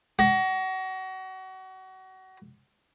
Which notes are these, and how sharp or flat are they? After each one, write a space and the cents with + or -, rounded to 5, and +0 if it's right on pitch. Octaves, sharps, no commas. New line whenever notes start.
F#4 +30